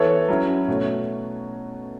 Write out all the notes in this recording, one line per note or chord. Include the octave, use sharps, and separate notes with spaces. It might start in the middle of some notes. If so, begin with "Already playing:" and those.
Already playing: E3 B3 A4 C#5
F#3 C#4 E4
B2 A3 F#4 C#5